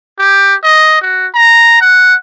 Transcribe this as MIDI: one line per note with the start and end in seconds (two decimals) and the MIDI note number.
0.19 0.55 67
0.64 0.99 75
1.02 1.27 66
1.35 1.78 82
1.81 2.14 78